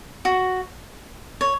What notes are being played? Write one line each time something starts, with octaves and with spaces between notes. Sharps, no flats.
F#4
C#5